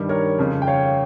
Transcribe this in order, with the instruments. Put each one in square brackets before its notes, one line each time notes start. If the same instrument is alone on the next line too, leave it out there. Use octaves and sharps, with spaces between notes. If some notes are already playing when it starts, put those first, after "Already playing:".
Already playing: [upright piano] G2 D#3 G3
A#4 C#5
F2 C#3 F3
G5
C#5 F5